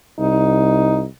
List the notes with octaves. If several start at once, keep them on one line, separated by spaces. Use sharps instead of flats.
C2 D#4